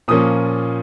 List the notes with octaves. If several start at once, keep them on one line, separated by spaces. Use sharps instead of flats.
A#2 F3 A#3 C#4 D#6